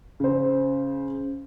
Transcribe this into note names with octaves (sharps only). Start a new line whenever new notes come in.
C#3 C5